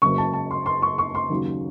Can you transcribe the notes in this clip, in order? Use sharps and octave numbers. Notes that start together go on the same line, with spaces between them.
F#1 F#2 C#3 C#6
A5
A5
C6
C6
C#6
C#6
C6
D#2 C#3 F#3